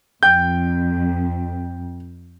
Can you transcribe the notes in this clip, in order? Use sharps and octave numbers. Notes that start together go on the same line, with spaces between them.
F2 G5 G6